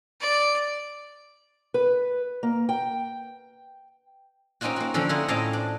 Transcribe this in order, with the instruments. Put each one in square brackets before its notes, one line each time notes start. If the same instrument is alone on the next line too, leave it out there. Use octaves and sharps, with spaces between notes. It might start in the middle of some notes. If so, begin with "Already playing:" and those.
[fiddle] D5
[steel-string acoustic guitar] B4
A#3
G5
[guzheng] A#3 C4 C#4 D#4 F4 F#4
A#3 F#4
D3 F3 A#3 C4 C#4
E4 F4 A#4 C5 D#5 F#5
A2 C4 C#4 D#5 F5 A5
D4